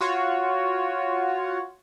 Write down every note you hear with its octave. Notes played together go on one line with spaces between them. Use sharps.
F4 F#4 C#5